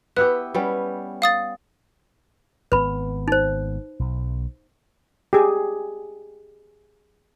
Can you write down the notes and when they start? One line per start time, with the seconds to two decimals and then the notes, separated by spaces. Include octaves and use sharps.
0.17 B3 E4 G4 B4 F#6
0.54 G3 B3 C#4
1.22 F5 D#6 A6
2.72 G#1 B3 B4 B5
3.28 D#4 C5
3.99 B1
5.33 G4 G#4